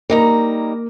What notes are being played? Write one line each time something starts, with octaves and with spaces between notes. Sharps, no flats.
G3 A#3 D#4 A#5